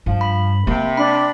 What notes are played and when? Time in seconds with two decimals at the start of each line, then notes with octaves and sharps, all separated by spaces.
0.06 G2 F3
0.21 B5
0.67 C3 A#3
0.97 D4 B5